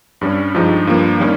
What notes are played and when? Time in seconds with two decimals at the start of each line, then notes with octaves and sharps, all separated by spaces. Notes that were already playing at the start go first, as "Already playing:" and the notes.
0.21 G2 G3 C#4
0.54 G2 F3 G#3 D#4 G4
0.87 G2 F3 A#3
1.20 D#3 G3 C#4